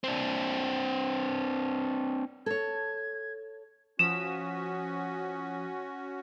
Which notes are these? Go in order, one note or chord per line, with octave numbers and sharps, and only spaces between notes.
C4 D4
A4 C#5 G#6
F3 C#4 F#4 D#6 B6 E7